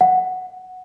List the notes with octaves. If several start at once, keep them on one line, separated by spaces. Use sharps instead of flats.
F#5